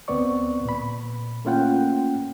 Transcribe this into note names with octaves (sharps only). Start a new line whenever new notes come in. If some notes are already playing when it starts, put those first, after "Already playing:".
D2 B3 C4 B4 D5 C#6
A#2 B5
A3 A#3 C#4 F4 F#5 G5